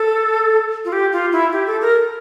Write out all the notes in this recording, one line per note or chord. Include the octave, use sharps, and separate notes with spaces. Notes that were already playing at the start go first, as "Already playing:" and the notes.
Already playing: A4
F4
G4
F4
E4
G4
A4
A#4